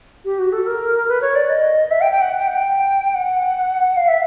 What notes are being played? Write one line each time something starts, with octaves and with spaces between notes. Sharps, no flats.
G4
F#4
A4
A#4
B4
C#5
D5
D#5
E5
G5
G5
F#5
G5
F#5
G5
F#5
F5
E5